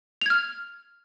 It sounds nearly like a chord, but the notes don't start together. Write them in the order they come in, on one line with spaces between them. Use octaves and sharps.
F7 G#6 F6